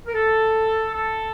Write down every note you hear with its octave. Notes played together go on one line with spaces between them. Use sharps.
A#4
A4
A4